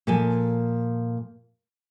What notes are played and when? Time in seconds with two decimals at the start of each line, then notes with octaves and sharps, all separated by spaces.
0.07 A#2 F3 A4 D5 G#5